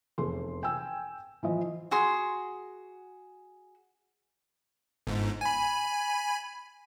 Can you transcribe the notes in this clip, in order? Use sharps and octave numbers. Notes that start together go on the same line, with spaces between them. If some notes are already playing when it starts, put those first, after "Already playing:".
F1 E2 A4 C6
G5 G#5 E6
E3 F3 D#5
F#4 G#4 C6
G1 G#2
G#5 B5